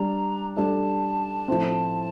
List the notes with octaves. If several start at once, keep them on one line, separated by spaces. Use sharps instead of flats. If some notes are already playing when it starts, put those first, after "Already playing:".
Already playing: G3 D4 A#5
G3 D4 A4 A5
A2 F3 A3 C4